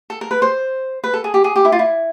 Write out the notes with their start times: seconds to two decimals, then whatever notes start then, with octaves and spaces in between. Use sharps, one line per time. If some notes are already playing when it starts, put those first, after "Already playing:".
0.10 A4
0.21 A#4
0.31 B4
0.42 C5
1.04 B4
1.14 A4
1.24 G#4
1.34 G4
1.44 G#4
1.56 G4
1.65 E4
1.72 F4
1.79 E4